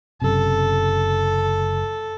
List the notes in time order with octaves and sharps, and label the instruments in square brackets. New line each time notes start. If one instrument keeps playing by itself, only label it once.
[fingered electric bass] F#1 F#2 C3 [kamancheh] A4